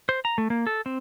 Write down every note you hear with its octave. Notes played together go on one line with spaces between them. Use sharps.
C5
A#5
A3
A#3
A4
C4